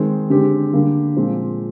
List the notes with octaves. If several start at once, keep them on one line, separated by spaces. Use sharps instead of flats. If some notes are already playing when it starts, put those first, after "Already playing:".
Already playing: D#3 G#3 C4
D3 G#3 C4 G4
D3 G3 A#3
A#2 F3 G#3 C4